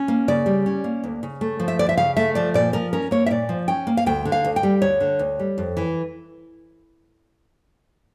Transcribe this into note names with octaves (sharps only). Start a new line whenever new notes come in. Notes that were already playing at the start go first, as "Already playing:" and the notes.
Already playing: C#4
A#3
C#3 D5
G3
C#4
A#3
D2
C#3
A3
F3
E5
D2 D5
E5
C#3 F5
A3 E5
F3 D5
A#2 D5
F3 A#4
C#4 A#4
A#3 C#5
E5
A#2 D5
F3
C#4 G5
A#3
F5
D2 G5
D3
F5
D2
G5
G3
D2 C#5
D3
D2
G3
F2
E3